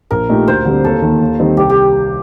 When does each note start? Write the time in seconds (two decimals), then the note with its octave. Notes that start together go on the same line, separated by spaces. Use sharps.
0.11 A#1 A#4
0.29 A#2 A3 D#4 G4
0.48 D2 C5
0.65 D3 G3 C4
0.84 D#2 A4
1.02 D#3 A#3
1.20 D#2
1.39 D#3 G3 C4 D#4
1.57 C2 G4
1.69 G4